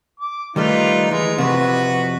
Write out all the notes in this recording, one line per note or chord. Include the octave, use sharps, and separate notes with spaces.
D6
D#3 G3 A3 D#4 F4 B4
E3 G#3
F2 C3 F#4 B4